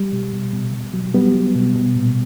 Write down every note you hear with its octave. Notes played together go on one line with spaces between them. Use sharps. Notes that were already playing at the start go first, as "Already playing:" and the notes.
Already playing: G3
B2
B2
B2
B2
F#3
F#3 G3 B3
F#3
B2
B2
A#2